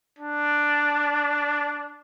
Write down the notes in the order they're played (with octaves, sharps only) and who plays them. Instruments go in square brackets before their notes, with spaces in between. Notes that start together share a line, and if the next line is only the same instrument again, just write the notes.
[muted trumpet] D4